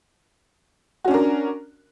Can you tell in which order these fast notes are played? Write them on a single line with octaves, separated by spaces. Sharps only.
F#4 C#4 D4 A#4